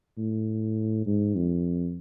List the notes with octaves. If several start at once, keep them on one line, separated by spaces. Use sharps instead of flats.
A2
G#2
F2